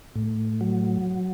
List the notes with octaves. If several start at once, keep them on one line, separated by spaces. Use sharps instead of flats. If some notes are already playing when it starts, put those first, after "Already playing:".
A2
F#3